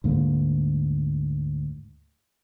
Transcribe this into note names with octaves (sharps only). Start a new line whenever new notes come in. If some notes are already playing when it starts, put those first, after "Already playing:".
D2 G#2 A3 A#3